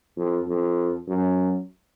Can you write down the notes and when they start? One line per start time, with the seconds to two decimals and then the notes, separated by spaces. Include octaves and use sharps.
0.17 F2
0.47 F2
1.08 F#2